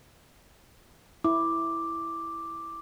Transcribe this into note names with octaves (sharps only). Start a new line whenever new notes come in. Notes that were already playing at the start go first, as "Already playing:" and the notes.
E4 D6